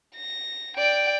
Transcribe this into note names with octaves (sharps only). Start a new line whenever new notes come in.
A#6
D5 G5